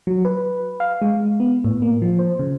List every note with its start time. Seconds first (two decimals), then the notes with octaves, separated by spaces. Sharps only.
0.07 F#3
0.25 B4
0.80 F5
1.02 G#3
1.40 B3
1.64 A2
1.82 A#3
2.02 F3
2.19 C5
2.39 C#3